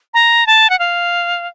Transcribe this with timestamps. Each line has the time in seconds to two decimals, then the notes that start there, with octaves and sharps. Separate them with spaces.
0.14 A#5
0.47 A5
0.70 F#5
0.79 F5